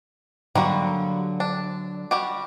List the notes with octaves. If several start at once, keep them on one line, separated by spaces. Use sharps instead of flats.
D3 F#3 G3 A#3 F#4
D4
G3 F#4 G4